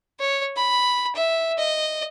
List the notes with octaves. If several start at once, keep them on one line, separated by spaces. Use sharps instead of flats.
C#5
B5
E5
D#5